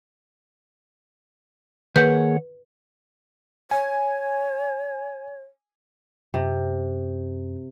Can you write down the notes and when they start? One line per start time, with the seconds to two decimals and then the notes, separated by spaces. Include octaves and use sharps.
1.96 D#3 A#3 G#4 B4 C#5 F#5 G6
3.71 C#5 G#5
6.34 F#2 C3